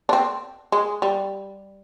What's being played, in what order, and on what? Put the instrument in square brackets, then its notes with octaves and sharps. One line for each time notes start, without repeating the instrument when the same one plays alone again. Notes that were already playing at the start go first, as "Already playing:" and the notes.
[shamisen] D4
C4
G#3
G3